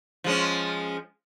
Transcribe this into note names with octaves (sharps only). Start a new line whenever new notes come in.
F3 G#3 C#4